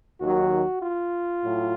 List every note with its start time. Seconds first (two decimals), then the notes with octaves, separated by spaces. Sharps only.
0.21 D#2 D#3 F#3 F#4
0.82 F4
1.43 A2 F#3